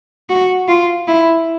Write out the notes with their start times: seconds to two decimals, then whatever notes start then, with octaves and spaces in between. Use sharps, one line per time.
0.29 F#4
0.68 F4
1.07 E4